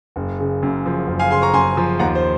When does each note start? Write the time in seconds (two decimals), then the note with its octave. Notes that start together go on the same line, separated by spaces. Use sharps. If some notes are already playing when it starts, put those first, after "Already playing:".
0.16 F#1
0.40 C#3
0.63 F#2
0.86 F3
1.08 F#1
1.19 F5 G#5
1.31 C#3 G#5 C6
1.42 A#5 C#6
1.53 F#2 G#5 C6
1.77 F3
1.99 D#2 F#5 A#5
2.15 C5